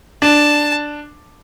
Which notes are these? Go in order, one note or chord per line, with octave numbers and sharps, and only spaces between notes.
D4 A5